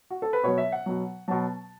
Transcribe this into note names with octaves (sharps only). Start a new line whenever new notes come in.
F#4
A4
B4
B2 F#3 C#5
E5
F#5
B2 F#3
B2 F#3 A5